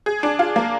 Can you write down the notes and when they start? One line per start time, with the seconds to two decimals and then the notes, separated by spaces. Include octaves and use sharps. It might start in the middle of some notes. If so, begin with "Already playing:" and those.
0.06 G#4
0.23 D4
0.39 F4
0.56 A#3